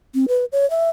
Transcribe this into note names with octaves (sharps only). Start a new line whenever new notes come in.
C4
B4
C#5
E5